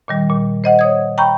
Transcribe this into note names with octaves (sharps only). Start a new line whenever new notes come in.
A#2 D#3 G3
A#2
C5 D#5 F#5
C#5 D#6 G#6
G5 A#5 B5 C#6 G6